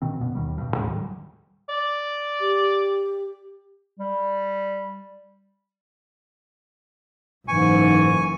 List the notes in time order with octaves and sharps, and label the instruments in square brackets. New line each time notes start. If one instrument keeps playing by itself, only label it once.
[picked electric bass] B2 D#3 C4
F#2 B2 B3
D#2 D#3 G3
G2 B2
A1 D#2 A2 G#3
D3 D#3 F#3 G3
[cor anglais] D5
[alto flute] G4
[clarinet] G3
[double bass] F#1 E3 [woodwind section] G#2 [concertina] G#5 C#6